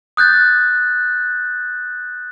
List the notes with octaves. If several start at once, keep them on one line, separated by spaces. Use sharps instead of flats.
D#6 F#6 G6 A6